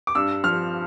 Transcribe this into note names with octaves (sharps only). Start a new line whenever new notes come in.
D6
G2 E6
F3 F6